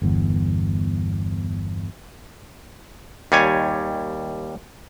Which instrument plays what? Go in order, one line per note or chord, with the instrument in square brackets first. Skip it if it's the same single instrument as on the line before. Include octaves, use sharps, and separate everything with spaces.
[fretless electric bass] G1 E2
[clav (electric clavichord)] D#2 G3 C#5 G#5